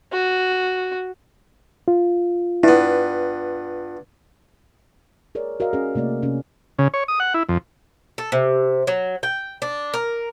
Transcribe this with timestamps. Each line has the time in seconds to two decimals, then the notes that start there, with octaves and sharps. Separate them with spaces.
0.12 F#4
1.88 F4
2.64 G2 B3 E4
5.35 G#4 A#4 C#5 D5
5.60 F#4 A#4 D5 D#5 F5
5.73 C#4 G#4
5.95 C3 A3 A#3 D5 D#5
6.22 C3 C#4
6.79 C#3
6.94 C#5
7.08 D#6
7.20 F#5
7.34 E4
7.49 F2
8.18 A4
8.32 C3
8.87 F#3
9.23 G5
9.62 D4
9.94 A#4